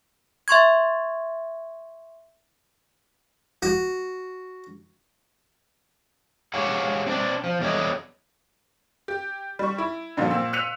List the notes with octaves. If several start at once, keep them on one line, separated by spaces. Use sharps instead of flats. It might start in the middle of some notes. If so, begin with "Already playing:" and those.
E5 C6 C#6 G#6
F#4
G4 G#4 C#5 F5 F#5
C4 D4 D5
F3
E2 D3 G3 E4 C#5 D#5
G4
G3 C#6
E4
G2 A#2 D3 F3 F#3
A#2 C4 E6
E6 F#6 B6 C#7 D#7 F7